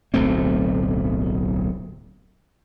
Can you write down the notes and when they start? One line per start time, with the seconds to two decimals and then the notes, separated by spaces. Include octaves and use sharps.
0.14 D1 B1 A3 C4